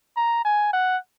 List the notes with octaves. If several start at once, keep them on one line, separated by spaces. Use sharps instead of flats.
A#5
G#5
F#5